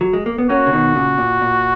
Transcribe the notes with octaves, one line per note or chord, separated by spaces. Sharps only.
F#3
G#3
A#3
B3
A#3 C#4 F#4
C#3
B2 D#3
A#2 C#3
A#2
A#2